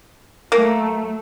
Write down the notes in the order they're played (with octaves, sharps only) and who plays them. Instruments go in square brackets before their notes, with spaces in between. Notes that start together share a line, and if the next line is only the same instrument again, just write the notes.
[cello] F#3 A3 [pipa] A#3